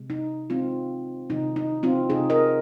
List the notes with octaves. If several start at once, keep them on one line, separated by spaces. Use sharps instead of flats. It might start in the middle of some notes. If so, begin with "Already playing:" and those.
Already playing: C3 G#3
D#4
D#3 G#3 C4 F4
C3 D#3 G#3 D#4
D#4
C4 F4
C3 G#3 D#4 G#4
A#4 D#5